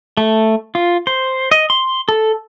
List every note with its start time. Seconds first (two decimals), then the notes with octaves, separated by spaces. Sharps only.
0.17 A3
0.75 F4
1.07 C5
1.51 D#5
1.70 C6
2.09 A4